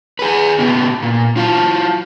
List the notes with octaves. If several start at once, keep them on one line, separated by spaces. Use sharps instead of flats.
G#4 B4
C3 B3
A#2
F#3 F4